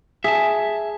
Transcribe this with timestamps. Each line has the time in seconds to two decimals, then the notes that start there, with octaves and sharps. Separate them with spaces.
0.24 G#4 E5 A5